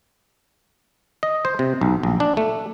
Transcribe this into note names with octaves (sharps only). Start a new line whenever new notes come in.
D#5
C5
C3
B1
A#1
D4
A3